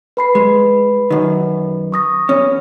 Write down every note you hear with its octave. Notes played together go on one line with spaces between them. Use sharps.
B4 B5 C7
G#3
F#2 D#3
C#6 D#6 A#6
E2 C#4